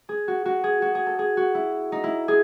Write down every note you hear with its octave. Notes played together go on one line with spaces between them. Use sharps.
G#4
F#4
F#4
G#4
F#4
G#4
A4
G#4
F#4
E4
D#4
E4
G#4